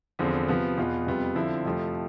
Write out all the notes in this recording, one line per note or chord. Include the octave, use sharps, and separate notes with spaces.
E2 D3 F3 C4
C3 F3 B3
E2 B2 B3 F4
F2 C3 G3 B3 F4
D3 F3 C4 E4
F2 C3 F3 A3